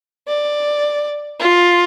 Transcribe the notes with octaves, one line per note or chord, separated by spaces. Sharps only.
D5
F4